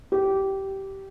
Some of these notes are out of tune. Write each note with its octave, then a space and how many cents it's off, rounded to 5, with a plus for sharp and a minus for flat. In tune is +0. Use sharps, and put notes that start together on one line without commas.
G4 -15